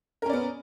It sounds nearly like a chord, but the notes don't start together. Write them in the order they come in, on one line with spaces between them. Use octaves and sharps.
A#4 C#4 D5 B3